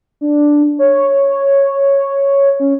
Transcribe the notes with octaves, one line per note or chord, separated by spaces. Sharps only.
D4
C#5
C#4